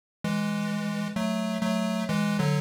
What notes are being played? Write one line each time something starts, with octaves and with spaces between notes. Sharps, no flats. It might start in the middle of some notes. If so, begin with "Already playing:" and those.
E3 G#3
F#3 A3
F#3 A3
E3 G#3
D3 F#3